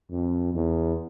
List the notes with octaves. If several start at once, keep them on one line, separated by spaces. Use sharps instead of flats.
F2
E2